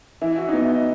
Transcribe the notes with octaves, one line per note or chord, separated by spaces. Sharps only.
E3 E4
E4
F#4
D#4
B3 E4
D#5